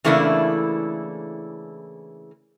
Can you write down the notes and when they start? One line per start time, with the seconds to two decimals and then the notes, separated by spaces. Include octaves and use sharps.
0.04 C#3 E3 A3 A#3 D4 E4